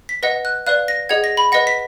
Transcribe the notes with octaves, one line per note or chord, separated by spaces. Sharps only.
B6
B4 D#5 F#5 A#6
F#6
B4 D5 F5 F#6
A#6
G#4 D#5 F#5 G#6
A#6
B5
B4 D#5 F#5 A#6
B6